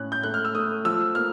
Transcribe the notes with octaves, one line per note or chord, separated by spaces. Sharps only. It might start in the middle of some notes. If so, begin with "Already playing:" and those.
Already playing: A2 C#4 F#6
G6
A3 F#6
F6
E6
A3 D#6
F3 E6
A#3 F6